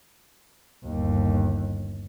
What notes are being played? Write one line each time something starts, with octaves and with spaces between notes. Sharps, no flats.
G1 D#2